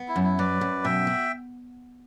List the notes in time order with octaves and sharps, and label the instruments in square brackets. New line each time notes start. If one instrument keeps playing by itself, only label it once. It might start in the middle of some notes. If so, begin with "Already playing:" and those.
Already playing: [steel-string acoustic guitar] B3
[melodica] E4
[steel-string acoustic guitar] F#2
[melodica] E4
[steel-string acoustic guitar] F#3 [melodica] B4 D5
[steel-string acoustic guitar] F#2
[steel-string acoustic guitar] B2 [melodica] E5 G5
[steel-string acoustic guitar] F#4